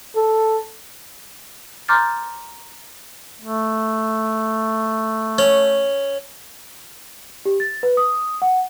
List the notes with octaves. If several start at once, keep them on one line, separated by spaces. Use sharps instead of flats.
A4
A#5 C6 D6 F6 G6 A6
A3
C#4
G4
A6
B4
D#6
F#5